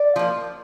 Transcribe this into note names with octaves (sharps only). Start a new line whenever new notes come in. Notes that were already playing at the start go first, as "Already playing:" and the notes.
Already playing: D5
F3 A#3